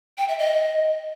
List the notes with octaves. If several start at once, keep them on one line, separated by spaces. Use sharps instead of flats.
G5
E5
D#5